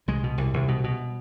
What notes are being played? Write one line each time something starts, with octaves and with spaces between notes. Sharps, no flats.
C2 G#3
B2
C2
C2
B2
B2